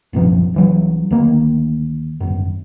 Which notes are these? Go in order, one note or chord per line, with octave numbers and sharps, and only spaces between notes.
D1 B1 F#2 F3
C2 E3 F#3
D2 D#3 A#3
G#1 F#2